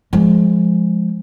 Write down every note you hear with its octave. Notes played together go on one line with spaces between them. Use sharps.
F3 G#3